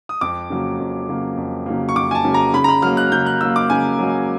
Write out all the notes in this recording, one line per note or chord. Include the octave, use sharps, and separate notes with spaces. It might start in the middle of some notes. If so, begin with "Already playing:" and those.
D#6
F2 D6
C#3 F#3 A#3
F2
C#3 F#3 A#3
F2
C#3 F#3 A#3
C#6
F2 D6
G#5
A5
C#3 F#3 A#3
A#5
C#3 B5
A#5
B5
F#3 A#3 F6
F#6
C#3 G6
F#6
F#3 A#3 E6
D6
C#3 G#5
F#3 A#3